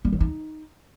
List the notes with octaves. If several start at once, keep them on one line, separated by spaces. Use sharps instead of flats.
G3
F#3
D#4